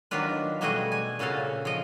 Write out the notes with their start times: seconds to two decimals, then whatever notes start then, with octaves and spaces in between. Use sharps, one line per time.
0.11 D#3 F#3 D4 F4 B4
0.61 B2 G3 A3 F#4 G#4 D#5
0.92 G#5
1.19 A#2 C#3 F#4 A4 F5
1.65 F3 D#5